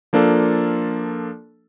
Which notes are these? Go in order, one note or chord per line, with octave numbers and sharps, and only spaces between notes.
F3 A#3 D4 F4 A4